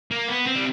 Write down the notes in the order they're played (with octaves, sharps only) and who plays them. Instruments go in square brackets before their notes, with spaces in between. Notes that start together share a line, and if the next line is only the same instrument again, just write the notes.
[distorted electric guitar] A#3
B3
C4
G3